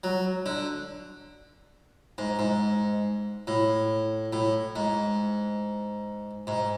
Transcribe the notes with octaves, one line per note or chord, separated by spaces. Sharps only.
F#3
D3
G#2
G#2
A2
A2
G#2
G#2